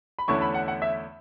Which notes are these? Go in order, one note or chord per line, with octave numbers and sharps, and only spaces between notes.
B5
E2 D3 A3 C#4 E4 C#6
B5
F#5
F#5
E5